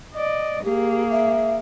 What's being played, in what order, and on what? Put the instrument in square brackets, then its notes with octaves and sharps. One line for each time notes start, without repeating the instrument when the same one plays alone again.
[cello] D5 D#5
[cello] A#3 G#4 [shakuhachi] G4
[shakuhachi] E5